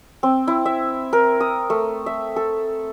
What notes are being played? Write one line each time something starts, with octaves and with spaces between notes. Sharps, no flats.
C4
E4
E5
A#4
D#6
A3
E5
A4